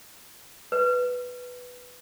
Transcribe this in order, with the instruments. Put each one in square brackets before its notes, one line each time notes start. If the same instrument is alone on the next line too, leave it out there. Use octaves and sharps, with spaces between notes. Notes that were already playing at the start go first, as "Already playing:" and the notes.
[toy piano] B4